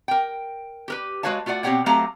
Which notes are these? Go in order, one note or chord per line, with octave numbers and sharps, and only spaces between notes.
A#4 G5
G4 A#4 B4
G#3 F#4 B4 C#5 F5 A5
A3 F4 F#4 D5 F#5
B2 C4 G4 C#5 F#5 G5
F#3 A3 C4 G4 F5 A#5